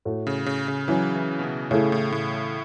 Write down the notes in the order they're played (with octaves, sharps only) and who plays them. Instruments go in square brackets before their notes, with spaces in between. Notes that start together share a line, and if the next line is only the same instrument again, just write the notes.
[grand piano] A2 A3 F#4
[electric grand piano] C#3
C#3
C#3
[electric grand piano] E3 [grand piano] F#3 C#4 E4
[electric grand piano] E3
B2
C#3
[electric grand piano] A2 [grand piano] C#3 A3 E4
[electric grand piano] A2
A2